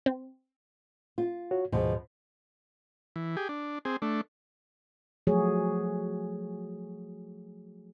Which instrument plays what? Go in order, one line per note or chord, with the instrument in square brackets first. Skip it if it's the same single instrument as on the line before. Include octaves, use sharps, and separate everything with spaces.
[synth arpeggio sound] C4
[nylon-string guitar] F4
[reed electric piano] F#4 C#5
[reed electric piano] D2 G#2 G#4 [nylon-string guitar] B2 F3
[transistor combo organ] E3
G4 G#4
D4
C4 G#4
A3 D4
[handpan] F3 F#3 A3 F#4 G#4 C#5